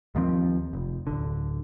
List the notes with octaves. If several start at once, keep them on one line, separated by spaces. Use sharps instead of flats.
D#2 D#3 F3 C4
F1
D1 B1 D3